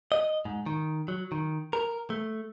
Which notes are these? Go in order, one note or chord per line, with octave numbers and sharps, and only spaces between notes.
D#5
G#2
D#3
F#3
D#3
A#4
A3